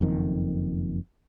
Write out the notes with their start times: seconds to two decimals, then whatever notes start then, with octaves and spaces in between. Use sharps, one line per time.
0.01 F#1 F2 D#3